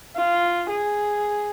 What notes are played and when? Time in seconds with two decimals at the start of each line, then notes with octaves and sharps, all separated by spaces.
0.16 F4
0.68 G#4